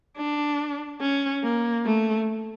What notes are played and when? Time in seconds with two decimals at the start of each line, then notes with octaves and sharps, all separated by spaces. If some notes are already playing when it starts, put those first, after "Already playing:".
0.17 D4
1.01 C#4
1.43 A#3
1.85 A3